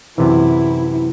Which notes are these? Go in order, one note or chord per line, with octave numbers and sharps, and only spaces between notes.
F#2 C3 E3 E4